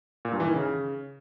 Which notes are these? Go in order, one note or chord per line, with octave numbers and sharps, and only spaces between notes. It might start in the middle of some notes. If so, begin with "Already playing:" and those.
A#2
G2
E3
D#3
C#3